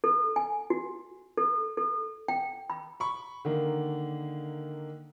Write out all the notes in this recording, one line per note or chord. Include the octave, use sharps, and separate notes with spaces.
A4
G#5
F#4
A4
A4
G5
B5
B5 C#6
D3 D#3 A#3